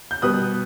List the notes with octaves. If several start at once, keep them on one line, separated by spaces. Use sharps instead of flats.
G6
B2 G3 B3 D#6 F#6